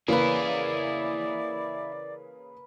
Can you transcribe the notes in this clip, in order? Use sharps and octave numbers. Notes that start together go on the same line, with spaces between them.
C#3 E3 A#3 E4 G#4 A#4 B4 D5